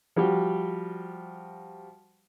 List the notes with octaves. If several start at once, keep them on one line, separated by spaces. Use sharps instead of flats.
F3 G3 F#4 G4